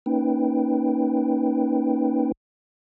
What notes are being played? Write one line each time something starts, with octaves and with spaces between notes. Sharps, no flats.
A#3 C#4 D#4 B4 G5